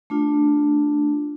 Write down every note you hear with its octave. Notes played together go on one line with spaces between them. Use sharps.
A3 D4 F4